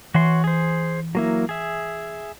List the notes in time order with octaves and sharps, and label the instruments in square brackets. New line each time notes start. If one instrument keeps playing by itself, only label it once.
[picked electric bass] E3 [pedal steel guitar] F#4 C#5 C6
[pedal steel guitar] G#4 C5
F#3 A#3 E4
G#4 E5